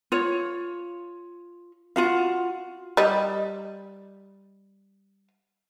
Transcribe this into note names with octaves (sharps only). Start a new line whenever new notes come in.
F4 C#5
F4 F#4 F5
G3 D#5